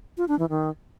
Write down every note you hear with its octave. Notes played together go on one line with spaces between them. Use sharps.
F4
D4
E3
D#3